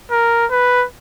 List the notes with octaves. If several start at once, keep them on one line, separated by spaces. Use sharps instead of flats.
A#4
B4